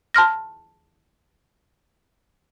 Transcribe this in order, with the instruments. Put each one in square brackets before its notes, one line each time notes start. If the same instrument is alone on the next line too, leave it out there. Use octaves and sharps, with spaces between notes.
[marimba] A5 C6 F6 A#6